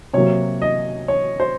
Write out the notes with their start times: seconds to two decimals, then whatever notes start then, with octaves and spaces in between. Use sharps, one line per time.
0.14 C3 F#3 A#3 C#5
0.62 D#5
1.08 C#5
1.40 C5